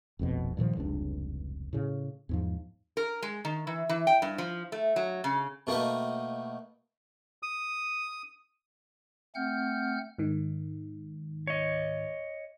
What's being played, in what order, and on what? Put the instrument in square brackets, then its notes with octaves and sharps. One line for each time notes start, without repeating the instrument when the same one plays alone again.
[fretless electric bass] F1 A#1 F2 B2
G2 A#2 D#3 F3
F1 C#2 G2 D4
A2 C#3
E2 G#2 F3
[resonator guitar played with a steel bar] A#4
G#3
D#3
E3
E3
G5
G2
F3
A3
F#3
C#3
[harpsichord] B2 A3 A#3 D#4 B4
[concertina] D#6
[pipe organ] A3 C4 F#5 F6 G6
[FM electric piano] G#2 D#3
[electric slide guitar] C#5 D#5